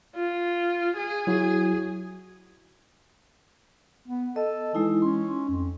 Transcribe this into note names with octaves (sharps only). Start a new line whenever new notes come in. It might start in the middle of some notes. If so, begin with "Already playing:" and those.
F4
G#4
F#3 E4 F#4
B3
A4 D#5
E3 G#3 D#4 E4
C#4 C6
F2